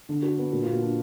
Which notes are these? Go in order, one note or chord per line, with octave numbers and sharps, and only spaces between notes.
D3
D4 F#4
B3
A#2 F#4
F4
A#2
F#4
D4